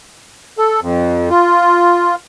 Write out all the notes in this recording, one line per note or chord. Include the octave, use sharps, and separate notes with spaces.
A4
F2
F4